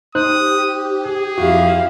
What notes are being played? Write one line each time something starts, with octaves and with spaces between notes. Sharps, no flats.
D#4 G4 C5 D#6 F#6
G#4
F2 E4 F#4 F5